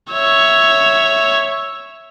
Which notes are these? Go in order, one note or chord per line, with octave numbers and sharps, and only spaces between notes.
C#5 E5